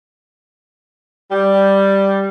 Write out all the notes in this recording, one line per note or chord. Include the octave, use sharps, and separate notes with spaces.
G3